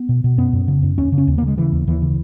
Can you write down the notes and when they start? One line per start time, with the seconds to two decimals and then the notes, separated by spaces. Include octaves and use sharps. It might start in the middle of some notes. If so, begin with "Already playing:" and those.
Already playing: B3
0.09 B2
0.24 B2
0.38 F#2 B3
0.53 F#2
0.68 C#3
0.83 F#2
0.98 D#2 C#4
1.12 C#3
1.18 C#4
1.27 D#2
1.38 C#3 A#3
1.47 G#3
1.57 C#3 E3
1.72 D#2
1.87 D#2 E3
2.02 C#3